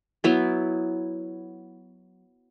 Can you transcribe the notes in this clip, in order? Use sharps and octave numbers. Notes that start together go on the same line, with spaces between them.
F#3 B3 E4